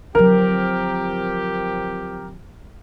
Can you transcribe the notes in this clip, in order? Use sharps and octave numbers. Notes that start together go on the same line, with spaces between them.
D3 F3 F#3 C4 G4 A#4